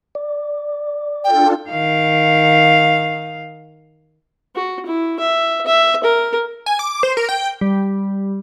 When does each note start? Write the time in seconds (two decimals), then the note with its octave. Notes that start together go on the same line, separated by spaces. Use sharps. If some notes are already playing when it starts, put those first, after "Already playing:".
0.15 D5
1.24 D4 F4 A4 G5
1.69 D#3 F5
4.56 F#4
4.86 E4
5.20 E5
5.67 E5
6.04 A#4
6.66 G#5
6.79 D6
7.03 C5
7.17 A#4
7.29 G5
7.61 G3